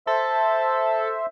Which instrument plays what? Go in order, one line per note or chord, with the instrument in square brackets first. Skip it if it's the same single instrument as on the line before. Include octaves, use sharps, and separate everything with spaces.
[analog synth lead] A4 [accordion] C5 E5